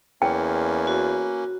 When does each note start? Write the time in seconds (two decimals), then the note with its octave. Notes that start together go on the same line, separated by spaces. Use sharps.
0.22 E2 A#3 C#4 G5
0.87 F#4